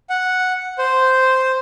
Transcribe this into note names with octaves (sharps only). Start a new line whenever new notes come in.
F#5
C5